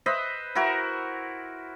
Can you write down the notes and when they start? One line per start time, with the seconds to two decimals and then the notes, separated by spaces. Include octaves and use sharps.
0.06 B4 C5 D#5 E5
0.55 E4 F#4 A#4